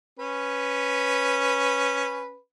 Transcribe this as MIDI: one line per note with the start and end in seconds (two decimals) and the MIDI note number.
0.19 2.38 61
0.19 2.38 71